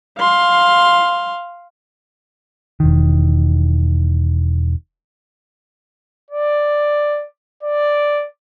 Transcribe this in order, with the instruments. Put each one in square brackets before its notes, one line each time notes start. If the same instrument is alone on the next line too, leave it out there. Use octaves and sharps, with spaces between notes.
[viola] F5 C6
[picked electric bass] E1 D#3
[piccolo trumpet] D5
D5